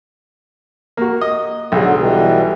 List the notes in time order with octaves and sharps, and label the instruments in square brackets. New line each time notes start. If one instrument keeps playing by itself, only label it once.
[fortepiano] A#3 F#4
D#5
[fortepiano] B1 G#4 [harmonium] D3 F#3
[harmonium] B2 E3 G3